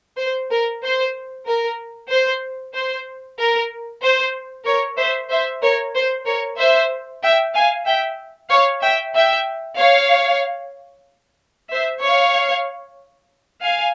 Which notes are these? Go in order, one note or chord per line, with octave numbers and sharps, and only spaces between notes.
C5
A#4
C5
A#4
C5
C5
A#4
C5
A#4 C#5
C5 E5
C5 E5
A#4 C#5
C5
A#4 C#5
C5 E5
E5 G5
F5 G#5
E5 G5
C#5 F5
E5 G5
E5 G5
C#5 F5
C5 E5
C#5 F5
F5 G#5